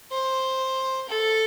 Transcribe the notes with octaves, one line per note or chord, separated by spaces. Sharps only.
C5
A4